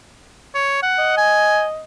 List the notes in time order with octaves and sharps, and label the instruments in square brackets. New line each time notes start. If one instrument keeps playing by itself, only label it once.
[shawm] C#5
F#5
[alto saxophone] D#5
[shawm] G#5